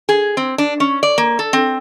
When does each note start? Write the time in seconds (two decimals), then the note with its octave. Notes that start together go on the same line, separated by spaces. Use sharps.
0.09 G#4
0.37 C4
0.58 D4
0.80 C#4
1.03 D5
1.18 A#3
1.39 A4
1.53 C4